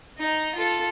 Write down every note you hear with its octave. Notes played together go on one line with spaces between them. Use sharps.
D#4
F4 A4